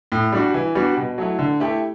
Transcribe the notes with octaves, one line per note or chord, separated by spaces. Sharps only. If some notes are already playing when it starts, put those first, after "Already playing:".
A2
G3 D4 F#4
E3
G3 B3 D4 F#4
B2
F#3 A3 E4
D3
A3 E4 G4